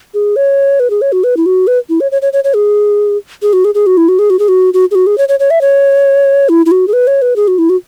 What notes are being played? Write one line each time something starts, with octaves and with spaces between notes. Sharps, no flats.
G#4
C#5
B4
G#4
C#5
F#4
B4
E4
F#4
B4
E4
C#5
C#5
C#5
C#5
C#5
G#4
G#4
F#4
G#4
G#4
F#4
E4
F#4
G#4
F#4
G#4
F#4
F#4
G#4
F#4
G#4
C#5
C#5
C#5
E5
C#5
E4
E4
F#4
G#4
B4
C#5
B4
G#4
F#4
E4
F#4